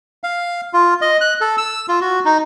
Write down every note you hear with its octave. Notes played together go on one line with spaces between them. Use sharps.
F5
F4
D#5
F#6
A4
E6
F4
F#4
D#4